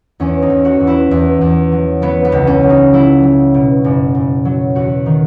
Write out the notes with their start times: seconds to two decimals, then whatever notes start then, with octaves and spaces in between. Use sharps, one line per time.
0.20 E2 C#4
0.42 D#4
0.50 E2
0.65 F#4
0.80 E2
0.87 E4
1.11 E2
1.41 E2
1.72 F#3
2.02 F#3 B3
2.25 B3
2.32 C#2
2.47 C#4
2.63 F#3
2.70 D#4
2.93 F#3 E4
3.23 F#3
3.54 B2
3.84 F#1
4.15 F#1
4.45 F#3
4.76 E2 F#4
5.06 D#3